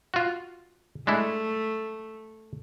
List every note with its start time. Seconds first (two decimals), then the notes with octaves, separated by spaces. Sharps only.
0.14 F4 F#4
1.07 G#3 A3 D4 E4